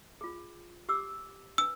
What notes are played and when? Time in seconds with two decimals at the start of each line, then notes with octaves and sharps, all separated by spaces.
0.21 F4 G#4
0.89 G4 D6 E6
1.58 D4 B4 E6